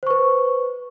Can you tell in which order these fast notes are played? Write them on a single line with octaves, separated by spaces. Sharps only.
C5 C#6 B4